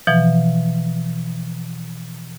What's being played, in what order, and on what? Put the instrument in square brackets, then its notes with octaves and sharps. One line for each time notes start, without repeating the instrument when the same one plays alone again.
[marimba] B2 E3 F3